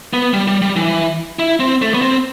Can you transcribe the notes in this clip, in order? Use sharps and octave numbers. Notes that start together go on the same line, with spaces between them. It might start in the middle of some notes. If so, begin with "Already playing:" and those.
B3
G3
G3
G3
E3
E4
C4
A3
B3
C4